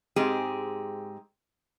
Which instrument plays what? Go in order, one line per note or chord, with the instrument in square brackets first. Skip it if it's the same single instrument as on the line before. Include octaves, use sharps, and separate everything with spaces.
[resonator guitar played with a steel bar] G#2 G#3 C4 G4 G#4